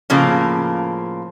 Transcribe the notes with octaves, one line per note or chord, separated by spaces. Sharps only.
A2 C#3 F3 A#3